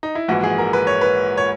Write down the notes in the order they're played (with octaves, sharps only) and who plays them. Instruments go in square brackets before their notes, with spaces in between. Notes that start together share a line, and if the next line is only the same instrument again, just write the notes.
[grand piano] D#4
E4
A#1 G#2 E3 F#4
G#4
A#4
B4
C#5
B4
C#5